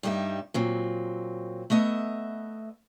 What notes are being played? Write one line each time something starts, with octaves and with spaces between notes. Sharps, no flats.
G2 G3 D#4 B4 E5
A#2 F#3 C4
A3 B3 D#5 E5